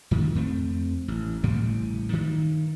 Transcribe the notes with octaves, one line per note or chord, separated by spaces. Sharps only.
F#2 D#3
F2 A3 C4
A1
A1 A2 C#3 G3
G2 D#3